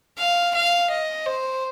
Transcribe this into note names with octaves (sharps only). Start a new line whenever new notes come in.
F5
F5
D#5
C5